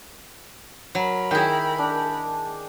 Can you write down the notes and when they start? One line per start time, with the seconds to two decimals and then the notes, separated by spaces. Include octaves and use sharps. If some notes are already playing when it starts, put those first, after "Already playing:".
0.95 F#3 A#4 B5
1.31 D#3 E4 G#4 G5
1.78 D4